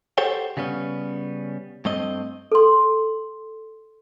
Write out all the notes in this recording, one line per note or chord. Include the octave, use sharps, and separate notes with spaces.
G4 A4 C5 C#5 F#5 G5
C#3 G3 B3 C#4
G2 A3 C4 D#5
A4 C6